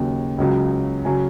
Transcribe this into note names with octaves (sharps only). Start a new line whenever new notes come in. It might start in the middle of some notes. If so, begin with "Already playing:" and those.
Already playing: D#2 C#3 F#3
C#2 C#3 F#3
C#3 F#3 G#5